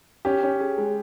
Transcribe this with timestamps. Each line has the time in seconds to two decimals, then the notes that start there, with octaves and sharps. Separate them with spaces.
0.25 C#4 G4
0.43 C#4
0.60 G#4
0.78 G#3